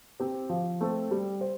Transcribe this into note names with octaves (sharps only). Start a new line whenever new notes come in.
C4 G4 C5
F3
A3 C4 A4
G3
C5